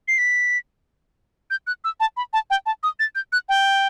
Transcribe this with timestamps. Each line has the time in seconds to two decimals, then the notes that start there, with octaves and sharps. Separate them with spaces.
0.08 C7
0.18 B6
1.51 G6
1.67 F#6
1.84 E6
2.00 A5
2.17 B5
2.33 A5
2.50 G5
2.66 A5
2.83 D#6
3.00 A6
3.15 G6
3.32 F#6
3.49 G5